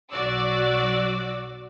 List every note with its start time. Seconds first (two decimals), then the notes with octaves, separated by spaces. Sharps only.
0.11 B1 F#3 F#4 D5 D6 E6